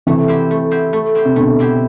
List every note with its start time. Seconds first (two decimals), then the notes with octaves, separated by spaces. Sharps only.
0.07 C3 E3 A3
0.28 C4 E4 G4 C5
0.51 A3
0.71 C4 E4 G4 C5
0.93 A3
1.15 C4 E4 G4 C5
1.25 C3
1.36 B2 D3 A3
1.59 C4 E4 G4 C5